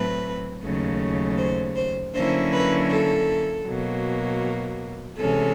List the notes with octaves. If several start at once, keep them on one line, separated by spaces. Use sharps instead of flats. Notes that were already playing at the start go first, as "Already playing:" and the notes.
Already playing: A2 F#3 A3 C4 B4
D#2 C#3 F#3 A3
C5
C5
D3 F#3 A#3 C#4 E4 C5
B4
A4
B2 F#3 A#3
C3 E3 G#3 C#4 A4